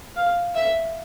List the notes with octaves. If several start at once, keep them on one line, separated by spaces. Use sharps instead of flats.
F5
E5